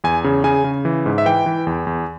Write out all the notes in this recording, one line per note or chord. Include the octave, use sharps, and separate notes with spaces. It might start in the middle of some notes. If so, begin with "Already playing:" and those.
E2 G#5
C#3
C#3 G#5
C#3
E3
G#2
E5
E3 G5
E3
E2
E2